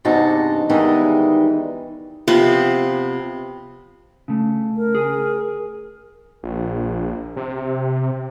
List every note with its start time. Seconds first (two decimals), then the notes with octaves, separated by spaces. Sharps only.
0.05 E2 G2 C3 D#4 F#4 A5
0.69 E2 D#3 E3 G3 G#3 D#4
2.27 C3 F3 B3 C5
4.28 C#3 A3
4.77 A#4
4.95 G#4 G#5
6.43 A#1
7.36 C3